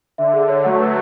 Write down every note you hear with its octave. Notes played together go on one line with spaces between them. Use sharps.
D3 E5
G#4
C#5
F#3 A3 F#5
B4